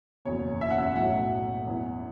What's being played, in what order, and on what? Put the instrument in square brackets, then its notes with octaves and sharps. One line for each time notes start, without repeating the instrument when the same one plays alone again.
[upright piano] F#1 E2 B2 C#5
E5
F#5
E5
B1 A2 F#3 F#5
E2 E3